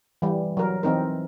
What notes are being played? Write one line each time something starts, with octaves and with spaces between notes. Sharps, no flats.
E3 G3
F#3 A#4
E3 C4 D#4 A#4